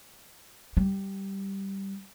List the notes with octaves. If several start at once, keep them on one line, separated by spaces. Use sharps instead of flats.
G3